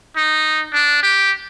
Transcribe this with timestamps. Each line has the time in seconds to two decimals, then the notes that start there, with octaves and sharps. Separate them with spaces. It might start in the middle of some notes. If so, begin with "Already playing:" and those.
0.16 D#4
0.73 D4
1.03 G4